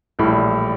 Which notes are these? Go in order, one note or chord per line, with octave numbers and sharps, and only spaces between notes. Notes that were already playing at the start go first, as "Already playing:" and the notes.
A#1 A2 E3 G3